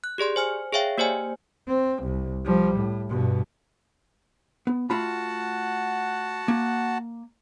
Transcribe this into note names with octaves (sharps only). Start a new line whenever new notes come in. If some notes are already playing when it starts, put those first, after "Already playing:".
F#6
G4 G#4 D5 C6
C5 G#5 F6
G#4 C#5 E5 F5 G5
A#3 G4 C5 D5 G#5
C4
C2
F3 G3
A2
G2 B2
B3
A3 F4 F#4 F#5 A5 B5
A#3